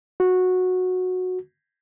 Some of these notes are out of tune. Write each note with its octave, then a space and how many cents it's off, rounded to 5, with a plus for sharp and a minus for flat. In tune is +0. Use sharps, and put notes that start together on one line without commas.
F#4 -10